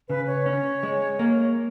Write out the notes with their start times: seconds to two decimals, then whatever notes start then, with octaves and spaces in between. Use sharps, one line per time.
0.09 C#3 B4
0.27 C#5
0.46 C#4
0.83 G#3
1.19 A#3